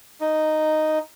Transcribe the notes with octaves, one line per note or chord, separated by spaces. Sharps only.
D#4